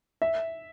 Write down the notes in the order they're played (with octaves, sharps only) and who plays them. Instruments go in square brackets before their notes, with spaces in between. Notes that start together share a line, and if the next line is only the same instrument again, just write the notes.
[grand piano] E5